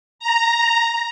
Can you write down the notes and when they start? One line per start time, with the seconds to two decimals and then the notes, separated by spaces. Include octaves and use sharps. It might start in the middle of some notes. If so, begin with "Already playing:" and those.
0.19 A#5